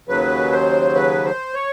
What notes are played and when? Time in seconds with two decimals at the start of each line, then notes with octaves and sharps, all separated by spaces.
0.08 D#2 C#3 F#3 B4
0.52 C5
0.95 B4
1.25 C5
1.54 C#5